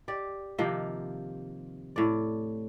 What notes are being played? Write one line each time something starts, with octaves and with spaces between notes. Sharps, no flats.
G4 D5
C3 D#3 F3 A#3
A2 D5